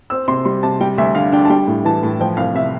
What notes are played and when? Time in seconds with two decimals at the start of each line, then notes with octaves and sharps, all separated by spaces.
0.10 C4 E6
0.28 C3 C6
0.45 G3 C6
0.63 C3 A5
0.80 G3 G5
0.98 D2 E5
1.15 D3 F5
1.32 D4 G5
1.45 A5
1.50 G3 G5
1.67 A2
1.85 E3 A5
2.03 A2
2.21 F3 G5
2.37 C2 F5
2.55 C3 E5